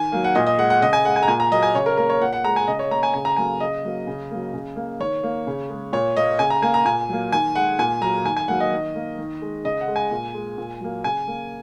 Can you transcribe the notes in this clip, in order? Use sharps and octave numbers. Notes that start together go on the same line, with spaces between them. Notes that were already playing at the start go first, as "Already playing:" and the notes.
Already playing: D#3 G#5
F#3 A#3
F#5
A#2 D#5
D#5
G#3 F#5
F#5
C#3 D#5
G#5
G#3 F#5
G#5
A#5
A#2 G#5
A#5
F#3 A#3 D#5
G#5
C#3 C#5
A#4
A#3 A#4
C#5
A#2 F#5
F#5
G#3 A#5
G#5
C#3 D#5
C#5
A#3 A#5
G#5
C#3 G#5
A#5
F#3 A#3 G#5
C#3 D#5
F#3 A#3
C#3
F#3 A#3
C#3
A#3
D#3 C#5
A#3
C#3
G#3
A#2 C#5
A#3 D#5
C#3 G#5
A#5
A#3 G#5
A#5
A#2 G#5
F#3 A#3
D#3 G#5
G#3 F#5
A#2 G#5
F#3 A#3 A#5
D#3 G#5
G#5
F#3 A#3 F#5
D#5
D#3
A#3
D#3
G#3
C#3 D#5
F#5
G#3
G#5
A#2
G#3
A#2
F#3 A#3
C#3 G#5
A#3